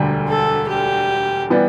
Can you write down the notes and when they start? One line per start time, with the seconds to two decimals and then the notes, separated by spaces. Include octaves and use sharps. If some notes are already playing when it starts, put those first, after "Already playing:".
Already playing: E1 D2 D3 G3
0.28 A4
0.68 G4
1.50 E3 G3 B3